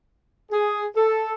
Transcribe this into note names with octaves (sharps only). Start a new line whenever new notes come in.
G#4
A4